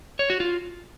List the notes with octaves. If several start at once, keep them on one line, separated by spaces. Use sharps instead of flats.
C#5
F#4
F4